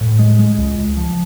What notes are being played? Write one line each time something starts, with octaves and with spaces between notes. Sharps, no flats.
A2
G#3
G#3
C#2
C#2
F3